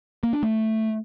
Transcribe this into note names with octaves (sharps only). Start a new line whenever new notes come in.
A#3
D4
A3